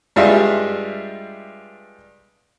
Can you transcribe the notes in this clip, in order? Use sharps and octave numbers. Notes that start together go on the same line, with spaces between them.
G2 G3 G#3 F4 E5